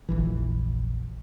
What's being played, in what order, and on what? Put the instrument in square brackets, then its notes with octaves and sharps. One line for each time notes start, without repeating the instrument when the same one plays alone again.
[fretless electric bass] F1 A#1 E3